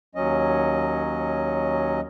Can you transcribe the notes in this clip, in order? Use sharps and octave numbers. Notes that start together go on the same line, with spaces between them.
D#2 F#3 C#4 D#5